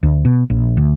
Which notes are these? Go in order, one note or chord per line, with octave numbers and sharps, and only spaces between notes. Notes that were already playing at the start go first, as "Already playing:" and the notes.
D2
B2
A#1
D2